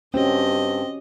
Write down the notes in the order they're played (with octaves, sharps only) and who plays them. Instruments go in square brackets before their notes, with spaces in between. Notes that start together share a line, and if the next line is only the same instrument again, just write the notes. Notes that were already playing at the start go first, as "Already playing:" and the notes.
[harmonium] G2 [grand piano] C4 [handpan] C#4 F#4 G4 [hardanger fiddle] D#5